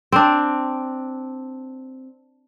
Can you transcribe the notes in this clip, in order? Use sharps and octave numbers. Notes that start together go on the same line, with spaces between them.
C4 D4